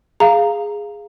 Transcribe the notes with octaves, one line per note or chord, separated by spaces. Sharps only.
G#4 F5 A#5